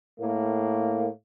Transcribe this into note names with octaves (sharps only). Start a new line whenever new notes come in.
A2 A#3